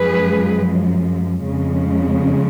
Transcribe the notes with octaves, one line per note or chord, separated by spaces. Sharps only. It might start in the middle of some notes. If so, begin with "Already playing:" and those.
Already playing: F#2 F3 G#3 G#4 B4
F2 C#3 G#3